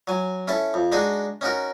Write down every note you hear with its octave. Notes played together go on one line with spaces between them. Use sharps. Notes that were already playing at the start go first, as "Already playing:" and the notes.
F#3 G#5
C#4 E4 A4 A5
F2
G#3 D4 D#4 F#4 G#4
C#4 D#4 F#4 A#4